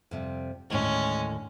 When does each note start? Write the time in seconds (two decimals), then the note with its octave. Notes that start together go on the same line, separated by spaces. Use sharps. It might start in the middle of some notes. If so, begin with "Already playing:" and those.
0.11 F2 C3 G3
0.70 D#2 A2 D3 G#3 C#4